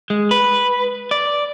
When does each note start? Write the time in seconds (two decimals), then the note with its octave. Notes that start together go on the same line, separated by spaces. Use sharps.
0.10 G#3
0.31 B4
1.11 D5